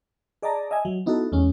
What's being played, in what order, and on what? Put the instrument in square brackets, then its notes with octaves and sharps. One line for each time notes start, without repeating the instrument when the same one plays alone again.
[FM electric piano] G#4 D5 D#5 A5 A#5
D#5 E5 G#5
F#3
B3 D#4 E4 F#4 A4
E2 G#3 C#4